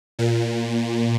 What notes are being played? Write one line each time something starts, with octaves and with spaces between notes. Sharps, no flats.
A#2